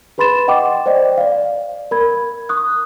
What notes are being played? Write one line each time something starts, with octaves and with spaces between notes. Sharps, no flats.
G#4 B4 B5 C6 A6 E7
D#5 F#5 G5 C#6 D6
C5 D5 D#5 G5
D5 F5
A#4 B5 G#6
C#6 D#6 F#6